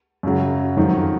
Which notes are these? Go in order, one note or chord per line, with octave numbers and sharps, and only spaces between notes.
F#2 C#3 F#3
F2 D#3 F#3